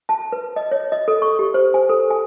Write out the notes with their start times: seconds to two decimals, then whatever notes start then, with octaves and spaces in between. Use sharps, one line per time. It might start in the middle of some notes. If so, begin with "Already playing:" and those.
0.09 A5
0.32 B4
0.56 D#5
0.71 C#5
0.92 D#5
1.08 A4
1.22 C#6
1.39 G4
1.54 C5
1.74 G#5
1.89 A4
2.10 G#5